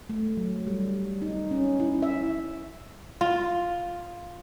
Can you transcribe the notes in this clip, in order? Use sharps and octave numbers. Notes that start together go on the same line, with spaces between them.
A3
F#3
G3
D#4
C#4
E4
E5
F4